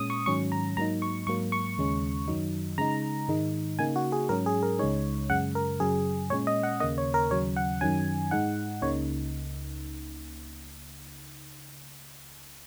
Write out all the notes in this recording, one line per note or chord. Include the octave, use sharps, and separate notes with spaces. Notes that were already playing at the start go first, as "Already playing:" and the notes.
Already playing: A#2 G#3 C#4 D#6
C#6
G#2 D#3 F#3 C#4 C#6
A#5
G#2 F#3 A#3 D#4 A#5
C#6
G#2 F#3 A#3 C#6
C#6
D#2 C#3 G#3 C#4
F#2 D#3 F#3 D#4
C#3 G#3 D#4 A#5
G#2 D#3 G#3 D#4
C#3 A#3 D#4 G#5
F#4
G#4
G#2 F#3 C#4 A#4
G#4
A#4
C#2 C#3 G#3 D#4 C#5
F#2 C#3 G#3 F#5
A#4
F#2 C#3 F#3 G#4
A#2 G#3 C#4 C#5
D#5
F#5
D#2 C#3 A#3 D#5
C#5
A#4
D#2 C#3 F#3 C#4 C#5
F#5
F#2 D#3 F#3 C#4 G#5
G#2 G#3 D#4 F#5
C#2 C#3 A#3 D#4 C#5